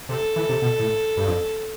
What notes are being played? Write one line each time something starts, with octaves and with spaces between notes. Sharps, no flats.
C3 A4
E3
C3
B2
A2
G2
F2